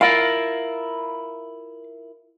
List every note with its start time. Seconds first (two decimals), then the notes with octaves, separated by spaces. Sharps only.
0.01 E4 F4 A#4 F5